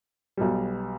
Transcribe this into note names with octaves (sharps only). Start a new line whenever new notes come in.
B1 B2 G3